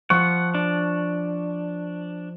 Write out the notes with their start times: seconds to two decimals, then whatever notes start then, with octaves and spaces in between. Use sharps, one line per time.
0.10 F3 F#5 C#6
0.55 D4